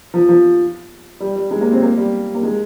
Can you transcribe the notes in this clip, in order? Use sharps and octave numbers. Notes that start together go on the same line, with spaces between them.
F3
F3
G3
G3
G#3
A#3
C4
A#3
G3
A#3
G#3